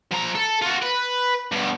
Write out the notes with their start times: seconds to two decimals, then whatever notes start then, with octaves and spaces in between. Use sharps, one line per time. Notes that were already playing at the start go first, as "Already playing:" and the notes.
0.12 F3 A#5
0.35 A4
0.62 F4 F#4
0.82 B4
1.52 G2 B2